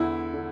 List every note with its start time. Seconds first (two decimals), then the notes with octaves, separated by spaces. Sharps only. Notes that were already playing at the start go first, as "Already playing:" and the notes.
Already playing: E2 D3 E4
0.33 D3